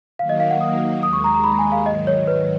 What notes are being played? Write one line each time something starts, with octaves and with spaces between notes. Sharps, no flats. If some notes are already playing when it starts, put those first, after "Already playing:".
D#3 F#3 A#3 F5
D#5
F5
F#5
D#6
D#2 D#3 G#3 D#6
C#6
A#5
A#5
B5
G#5
F5
G#2 D#3 F#3 D#5
C#5
B4